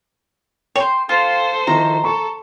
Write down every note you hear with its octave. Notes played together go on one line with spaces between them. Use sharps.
C5 C#5 G5
F4 A4 C5
D#3 F3 E4 A#5
A4 B5 C#6